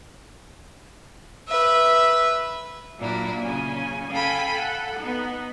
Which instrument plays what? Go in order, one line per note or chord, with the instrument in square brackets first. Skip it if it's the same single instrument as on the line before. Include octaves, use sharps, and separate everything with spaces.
[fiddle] B4 E5
[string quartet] A#2 F#3 A#3 D4 E4 A#4
C#3 C#4 G#5
A4 F5 G5 G#5 B5 G6
A4 F#5
B3 D#4